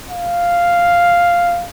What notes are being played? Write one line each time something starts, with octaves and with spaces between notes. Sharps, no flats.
F5